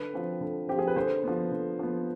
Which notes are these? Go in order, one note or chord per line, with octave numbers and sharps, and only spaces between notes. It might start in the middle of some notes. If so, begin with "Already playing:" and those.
Already playing: D3 B4
F3 C4
D3
F3 C4 G4
G#4
B4
D3 C5
F3 B3
D3
F3 B3